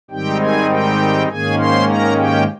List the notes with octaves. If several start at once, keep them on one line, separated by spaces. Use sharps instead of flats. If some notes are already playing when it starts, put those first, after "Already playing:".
G#2 D#3 G3 C4 D#4 G4 G5
G#4 G#5
G4 G5
G#2 D#3 A#3 C#4 G#4 G#5
C5 C6
A#4 A#5
G4 G5